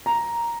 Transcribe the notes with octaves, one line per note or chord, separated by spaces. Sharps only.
A#5